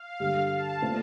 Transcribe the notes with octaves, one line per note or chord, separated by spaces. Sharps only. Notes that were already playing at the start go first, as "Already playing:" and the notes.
Already playing: F5
G2 D3 G3
A5
A#2 A3 C4